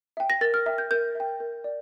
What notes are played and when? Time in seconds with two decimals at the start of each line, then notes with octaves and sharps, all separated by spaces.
0.17 E5 G5
0.30 A#6
0.41 A#4 A6
0.54 F6
0.66 E5 G5
0.78 G6
0.91 A#4 G6
1.15 E5 G5
1.40 A#4
1.64 D5